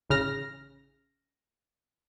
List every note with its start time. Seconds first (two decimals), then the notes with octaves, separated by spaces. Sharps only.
0.10 A1 C#3 F6 A#6